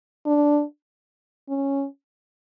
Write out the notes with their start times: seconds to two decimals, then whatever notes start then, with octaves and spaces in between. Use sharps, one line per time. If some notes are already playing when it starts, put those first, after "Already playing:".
0.26 D4
1.49 C#4